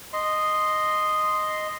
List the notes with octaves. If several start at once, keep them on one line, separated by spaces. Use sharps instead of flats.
D#5 C6